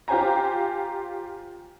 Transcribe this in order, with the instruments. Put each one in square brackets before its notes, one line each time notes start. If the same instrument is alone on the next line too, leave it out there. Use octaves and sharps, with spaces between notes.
[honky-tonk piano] F4 G4 C5 G#5 A#5